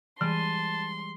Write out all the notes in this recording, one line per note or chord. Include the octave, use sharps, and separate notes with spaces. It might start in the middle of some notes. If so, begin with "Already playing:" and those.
E3 G3 G#3 A5 C6 D#7